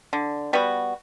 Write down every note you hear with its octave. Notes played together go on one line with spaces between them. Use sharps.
D3
G3 B3 F#4